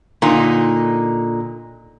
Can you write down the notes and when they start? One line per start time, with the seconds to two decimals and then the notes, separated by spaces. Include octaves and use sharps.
0.22 A#2 D3 D#4